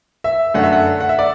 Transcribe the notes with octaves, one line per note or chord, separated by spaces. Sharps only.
E5
F#2 D3 A3 F#5
E5
F#5
F#5
E5
D5